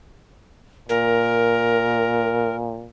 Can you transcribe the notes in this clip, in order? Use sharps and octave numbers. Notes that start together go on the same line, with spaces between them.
A#2 A#4